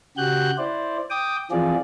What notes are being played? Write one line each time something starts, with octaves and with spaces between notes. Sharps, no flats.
C#3 F#4 G4 F#6 G6
E4 C5 D5
G5 D6 D#6
E3 F3 C4 F4 G#4 D5